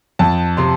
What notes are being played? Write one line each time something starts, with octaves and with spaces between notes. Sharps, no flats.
F2 A5
C3 C6